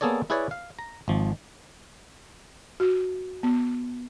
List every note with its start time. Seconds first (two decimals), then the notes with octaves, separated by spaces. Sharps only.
0.01 A#3 B3 G#4 A4 C#5 D5
0.30 E4 G#4 B4 C#5 D5
0.51 F5
0.79 A#5
1.08 G#1 F3
2.80 F#4
3.43 B3